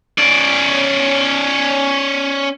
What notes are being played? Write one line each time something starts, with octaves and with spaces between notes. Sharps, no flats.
C#4 D5